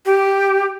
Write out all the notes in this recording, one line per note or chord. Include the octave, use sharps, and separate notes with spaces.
G4